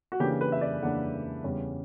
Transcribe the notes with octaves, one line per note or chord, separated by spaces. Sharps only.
F#4
C#3 E3 A#3 D4 G4
B4
E5
D5
C#3 E3 A#3 D4 F#5
E2 C#3 G3 C#4